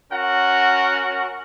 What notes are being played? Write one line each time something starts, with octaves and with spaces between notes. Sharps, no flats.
C#4 F#4 A#4 F#5